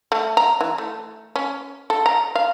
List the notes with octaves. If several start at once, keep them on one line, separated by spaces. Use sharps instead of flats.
A3
A#5
E3
A3
C#4
A4
A#5
F5